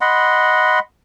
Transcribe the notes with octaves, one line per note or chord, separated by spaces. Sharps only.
D#5 F#5 B5 C6